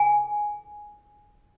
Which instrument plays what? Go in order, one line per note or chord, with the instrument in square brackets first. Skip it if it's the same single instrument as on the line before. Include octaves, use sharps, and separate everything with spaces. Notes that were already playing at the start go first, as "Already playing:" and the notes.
Already playing: [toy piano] G#5